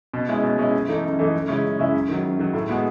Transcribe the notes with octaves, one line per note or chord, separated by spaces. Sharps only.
B2
G#3 C#4 E4
B2
G#3 C#4 E4
F#2
E3 A3 D#4
F#2
E3 A3 D#4
F#2
C#3 G#3 C#4 E4
F#2
C#3 G#3 C#4 E4
F#2
D#3 F#3
F#2
D#3 F#3
A2
G#3 B3 F#4